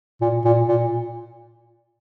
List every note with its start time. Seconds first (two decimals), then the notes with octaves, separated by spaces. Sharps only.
0.21 A#2
0.45 A#2
0.68 A#2